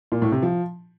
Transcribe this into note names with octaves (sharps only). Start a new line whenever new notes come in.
A#2
A2
C3
F3